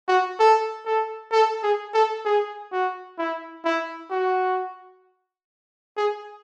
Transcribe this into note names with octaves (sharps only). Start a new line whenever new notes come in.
F#4
A4
A4
A4
G#4
A4
G#4
F#4
E4
E4
F#4
G#4